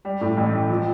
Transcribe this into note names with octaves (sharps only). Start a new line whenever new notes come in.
G3
A2
A1
A1
F3